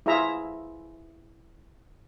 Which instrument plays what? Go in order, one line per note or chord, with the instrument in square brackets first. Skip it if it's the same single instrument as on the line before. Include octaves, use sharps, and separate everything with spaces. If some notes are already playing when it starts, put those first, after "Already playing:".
[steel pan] E4 F4 G#4 E5 A#5